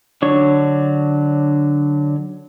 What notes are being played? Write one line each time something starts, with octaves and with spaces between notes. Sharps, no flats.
D3 F#3 D4 C#5 C#6